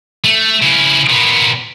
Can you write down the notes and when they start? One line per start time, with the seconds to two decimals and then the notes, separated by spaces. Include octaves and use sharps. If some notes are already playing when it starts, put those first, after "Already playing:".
0.24 A3
0.62 C#3 E4
1.09 A#2 B3